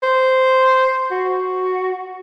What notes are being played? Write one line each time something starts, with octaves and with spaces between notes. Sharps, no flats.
C5
F#4